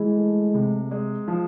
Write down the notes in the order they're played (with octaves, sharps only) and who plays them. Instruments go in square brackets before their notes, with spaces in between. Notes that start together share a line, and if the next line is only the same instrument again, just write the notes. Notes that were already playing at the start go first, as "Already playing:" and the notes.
Already playing: [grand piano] E3 [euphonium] G#3
[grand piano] A3
C3
G#3
F3